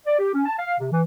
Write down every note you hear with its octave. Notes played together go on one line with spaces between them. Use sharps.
D5
G4
C#4
A5
F5
C3
E3